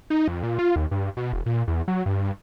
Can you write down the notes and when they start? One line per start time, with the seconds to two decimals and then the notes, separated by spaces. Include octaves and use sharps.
0.10 D#4
0.28 F2
0.43 A#2
0.59 F4
0.76 D#2
0.91 G2
1.17 B2
1.33 E1
1.46 A#2
1.68 E2
1.88 F#3
2.06 G2